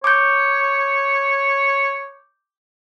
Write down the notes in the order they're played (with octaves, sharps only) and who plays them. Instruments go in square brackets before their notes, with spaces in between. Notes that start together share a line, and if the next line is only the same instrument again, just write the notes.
[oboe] C#5 [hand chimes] D6 G6